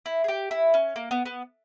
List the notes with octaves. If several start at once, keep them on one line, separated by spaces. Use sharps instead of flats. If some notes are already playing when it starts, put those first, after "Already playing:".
E4
G#4
G4
E4
C#4
A#3
B3
B3